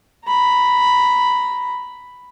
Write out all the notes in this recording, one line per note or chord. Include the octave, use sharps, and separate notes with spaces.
A#5 B5